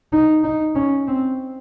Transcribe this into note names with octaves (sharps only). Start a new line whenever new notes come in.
D#4
D#4
C#4
C4